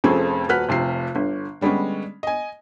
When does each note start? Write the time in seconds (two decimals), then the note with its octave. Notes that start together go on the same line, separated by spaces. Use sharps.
0.04 F1 F2 C4 C#4 G#4 A4
0.49 D#1 F#4 B4 F6 F#6 B6
0.69 F1 C3 F3 C7
1.15 G1 D3
1.61 D3 G3 G#3 B3 C#4
2.23 D#5 G#5